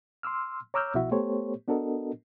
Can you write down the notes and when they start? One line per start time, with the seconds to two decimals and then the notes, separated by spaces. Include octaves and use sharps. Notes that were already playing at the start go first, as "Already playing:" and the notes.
0.23 C6 D6 E6 F6
0.74 C#5 A#5 D6 E6 F6 G6
0.94 C2 B2 F3 E4 F#4 E5
1.11 A3 B3 G4 A4 C5 C#5
1.67 B3 D4 F#4 A4 A#4 D#5